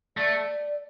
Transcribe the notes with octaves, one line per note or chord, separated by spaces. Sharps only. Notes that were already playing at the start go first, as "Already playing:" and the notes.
A3 D5